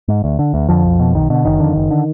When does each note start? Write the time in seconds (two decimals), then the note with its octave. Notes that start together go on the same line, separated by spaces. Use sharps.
0.08 G#2
0.24 D2
0.39 D3
0.54 D2
0.69 F2 D3 F3
0.84 B1
0.99 B2
1.14 B1 D#3
1.30 B2 D3
1.45 F#1 D#3
1.60 F2 D3
1.76 F#1
1.91 D3